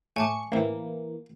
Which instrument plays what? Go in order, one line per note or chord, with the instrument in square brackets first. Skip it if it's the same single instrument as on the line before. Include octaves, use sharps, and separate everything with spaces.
[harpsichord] A2 [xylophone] G#5 A5 D6 [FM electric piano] C#6 C#7
[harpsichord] A1 C4 [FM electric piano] E3 A#3